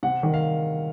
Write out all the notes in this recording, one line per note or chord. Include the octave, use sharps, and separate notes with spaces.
C3 F#5
D#3
F5